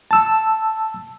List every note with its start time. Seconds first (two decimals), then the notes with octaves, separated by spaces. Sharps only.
0.11 A5 E6